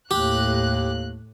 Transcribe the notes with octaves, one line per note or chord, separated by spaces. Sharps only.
D#2 A2 G4 F#6